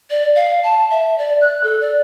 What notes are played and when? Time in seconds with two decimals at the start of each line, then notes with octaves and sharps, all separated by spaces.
0.10 D5
0.36 F5
0.63 A5
0.91 E5
1.18 D5
1.41 F#6
1.64 A4
1.81 D5